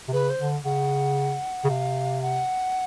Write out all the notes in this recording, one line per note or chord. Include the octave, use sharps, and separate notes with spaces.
C3
C#3 B4
C5
D3
C#3 F#5
C#3
C3 F5
F#5